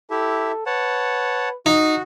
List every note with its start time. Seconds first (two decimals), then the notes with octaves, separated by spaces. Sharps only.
0.10 E4 G4 A4 E5
0.66 B4 C#5 F#5 A5
1.66 D#4 F#4